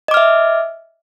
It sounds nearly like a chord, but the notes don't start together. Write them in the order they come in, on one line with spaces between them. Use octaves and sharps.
D#5 D6 F6 E5